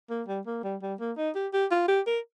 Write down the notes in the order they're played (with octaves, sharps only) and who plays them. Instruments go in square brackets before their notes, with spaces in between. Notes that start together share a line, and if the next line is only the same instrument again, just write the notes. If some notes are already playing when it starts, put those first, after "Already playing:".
[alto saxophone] A#3
G3
A#3
G3
G3
A#3
D#4
G4
G4
F4
G4
A#4